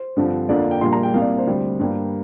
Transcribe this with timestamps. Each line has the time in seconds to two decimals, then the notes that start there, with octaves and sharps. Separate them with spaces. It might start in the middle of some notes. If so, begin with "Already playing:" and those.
Already playing: C5
0.16 G2 D3 F3 C4
0.49 F2 D3 F3 A#3 D5
0.60 F5
0.71 G5
0.81 A#1 A#2 G3 A#3 C6
0.92 A#5
1.03 G5
1.14 C2 C3 A#3 F5
1.22 D5
1.38 C5
1.47 D2 C3 G3
1.79 G2 G3 A#3